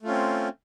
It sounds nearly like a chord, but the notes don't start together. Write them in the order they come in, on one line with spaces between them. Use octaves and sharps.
A3 F4 C#4 C4